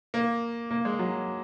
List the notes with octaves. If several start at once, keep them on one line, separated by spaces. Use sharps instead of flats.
A#3
A#3
G#3
F#3